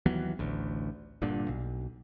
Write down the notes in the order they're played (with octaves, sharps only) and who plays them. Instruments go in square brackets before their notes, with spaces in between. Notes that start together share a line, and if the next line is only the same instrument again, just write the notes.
[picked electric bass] D#2 E3 F#3 B3
A1 D2
G1 G2 A#2 D3
B1